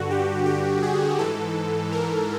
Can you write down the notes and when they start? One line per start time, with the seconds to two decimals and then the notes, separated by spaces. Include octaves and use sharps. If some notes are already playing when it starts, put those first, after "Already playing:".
Already playing: G2 D3 F#4
0.11 G4
0.46 G4
0.83 G#4
1.19 G#2 E3 A4
1.92 A#4